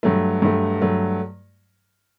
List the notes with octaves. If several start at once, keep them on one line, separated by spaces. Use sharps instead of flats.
G2 F#3 A3
G2 F#3 A3
G2 F#3 A3